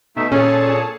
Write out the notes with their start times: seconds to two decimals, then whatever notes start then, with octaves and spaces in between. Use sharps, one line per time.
0.17 B2 A3 D#4 E5
0.32 A#2 C#4 G#4 A4 C#5 A5